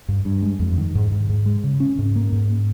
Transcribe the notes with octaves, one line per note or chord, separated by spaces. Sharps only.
G2
G2
G#3
F2
D#3
G#2
G#2
G#2
G#3
C#3
C#4
G#2
A#3
G#2